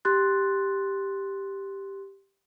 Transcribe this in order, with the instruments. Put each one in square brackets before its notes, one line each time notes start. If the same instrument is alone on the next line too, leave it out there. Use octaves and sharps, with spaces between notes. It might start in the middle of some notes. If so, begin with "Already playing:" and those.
[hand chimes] G4 C6 F#6 A6